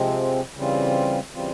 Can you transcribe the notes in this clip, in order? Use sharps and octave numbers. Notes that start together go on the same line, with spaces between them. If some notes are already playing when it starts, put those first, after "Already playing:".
Already playing: C3 F3 G#3 C4
C#3 E3 G3 C4 F4
C#3 E3 G3 C4 F4